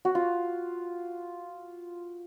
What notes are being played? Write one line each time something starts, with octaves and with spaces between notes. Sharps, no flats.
F#4
F4